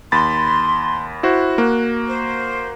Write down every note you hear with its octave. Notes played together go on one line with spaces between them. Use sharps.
D#2 B5 C6 A6
E4 F#4 C5 F#6
A#3 F#4
C5